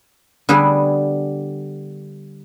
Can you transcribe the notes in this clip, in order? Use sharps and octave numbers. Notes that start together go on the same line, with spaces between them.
D3 G3 B3 G#4